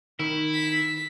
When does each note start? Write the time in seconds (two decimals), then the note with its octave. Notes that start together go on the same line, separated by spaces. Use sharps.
0.19 D#3 E4
0.54 B6